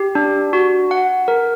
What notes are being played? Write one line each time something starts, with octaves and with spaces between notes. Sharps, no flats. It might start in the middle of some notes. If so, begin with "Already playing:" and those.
Already playing: G4
D4
F#4
F#5
A#4